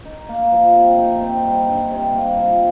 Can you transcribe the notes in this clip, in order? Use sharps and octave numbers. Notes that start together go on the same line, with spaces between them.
D#4
A#3
F3
C3
D#4
C4
G3
G2
C3
A#3
F3